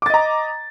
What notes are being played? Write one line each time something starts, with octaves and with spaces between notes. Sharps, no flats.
D#5 A#5 D6 A6